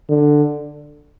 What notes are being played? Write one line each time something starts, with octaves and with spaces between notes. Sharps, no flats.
D3